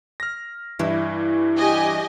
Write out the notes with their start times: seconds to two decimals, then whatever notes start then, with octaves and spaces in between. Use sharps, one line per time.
0.20 F6 A#6
0.79 G2 E3 E4
1.56 G4 D#5 G#5